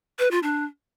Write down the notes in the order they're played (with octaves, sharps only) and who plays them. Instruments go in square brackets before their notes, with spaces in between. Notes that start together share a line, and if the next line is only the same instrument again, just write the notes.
[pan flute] B4
F4
D4